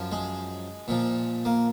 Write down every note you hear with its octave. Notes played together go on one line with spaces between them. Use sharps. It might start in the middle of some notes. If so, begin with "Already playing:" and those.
Already playing: F#2 F3
G#3
A#2 F3
A#3